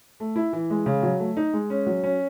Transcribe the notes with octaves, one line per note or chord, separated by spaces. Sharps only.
A3
E4
E3
G#3
C#3
F#3
A3
D#4
G#3
C#4
F#3
C#4